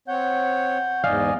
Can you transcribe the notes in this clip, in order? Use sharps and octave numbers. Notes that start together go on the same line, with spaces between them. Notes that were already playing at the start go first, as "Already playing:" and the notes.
C4 C#5 F#5 G6
E2 G#2 D5 D#5 F5 G#5